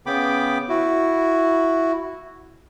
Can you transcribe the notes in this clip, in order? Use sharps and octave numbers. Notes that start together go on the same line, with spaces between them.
C#3 B3 G5 B5 D6
E4 F#4